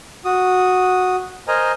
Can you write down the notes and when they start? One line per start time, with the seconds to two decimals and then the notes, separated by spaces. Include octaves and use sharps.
0.25 F#4 D#6
1.48 A#4 C5 D#5 G#5 A#5